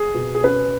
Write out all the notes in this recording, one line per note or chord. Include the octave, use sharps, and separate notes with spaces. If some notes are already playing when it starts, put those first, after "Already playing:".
Already playing: G#4
B2
G#4
C#4 B4